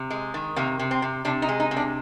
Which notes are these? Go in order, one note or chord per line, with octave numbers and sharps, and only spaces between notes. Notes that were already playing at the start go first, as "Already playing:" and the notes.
Already playing: C3
G#3
D#3
C3 A#3
C3
C4
C3
C3 D4
D#4
G#3
D#4
C3
D4